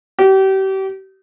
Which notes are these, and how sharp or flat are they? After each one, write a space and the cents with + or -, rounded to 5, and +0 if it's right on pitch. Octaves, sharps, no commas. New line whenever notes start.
G4 -35